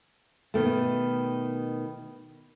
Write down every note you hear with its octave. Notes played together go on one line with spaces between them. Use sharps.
B2 D#3 A3